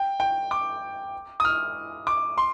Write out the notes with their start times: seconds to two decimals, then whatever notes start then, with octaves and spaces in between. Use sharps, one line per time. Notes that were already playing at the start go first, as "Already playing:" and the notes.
Already playing: G5
0.20 G5
0.51 D6
1.40 D#6
1.45 F6
2.07 D6
2.38 C6